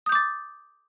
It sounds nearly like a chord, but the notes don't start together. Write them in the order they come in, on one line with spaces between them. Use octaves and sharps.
D#6 G6 D6 A6